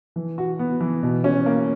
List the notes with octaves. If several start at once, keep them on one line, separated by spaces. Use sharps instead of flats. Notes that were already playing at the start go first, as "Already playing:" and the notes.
E3
F#4
B3
E3
B2
C#4
A#3